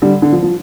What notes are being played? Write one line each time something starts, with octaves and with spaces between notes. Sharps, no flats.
D3 G3
D3
F3
F3